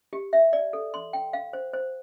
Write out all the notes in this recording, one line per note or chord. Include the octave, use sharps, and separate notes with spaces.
G4
E5
D5
A4
C6
G5
F5
C5
C5